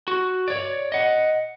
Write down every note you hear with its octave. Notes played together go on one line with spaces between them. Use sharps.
F#4
C#5 D5
D#5 F#5